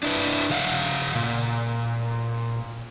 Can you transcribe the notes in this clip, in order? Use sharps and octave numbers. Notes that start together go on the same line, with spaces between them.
D4 E4 B4
C#3 F5 F#5
A#2